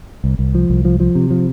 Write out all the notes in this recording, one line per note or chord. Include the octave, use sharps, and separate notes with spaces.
C2
C2
F3
C2
F3
F3
C3
F3